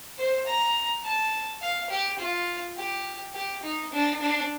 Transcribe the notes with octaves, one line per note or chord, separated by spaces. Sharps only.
C5
A#5
A5
F5
G4
F4
G4
G4
D#4
D4
D4